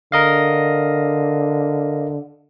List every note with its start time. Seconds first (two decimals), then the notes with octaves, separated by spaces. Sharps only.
0.12 D3 A#4 D#5 F5